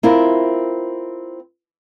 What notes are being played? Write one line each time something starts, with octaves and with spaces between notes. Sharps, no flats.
C4 E4 F4 A#4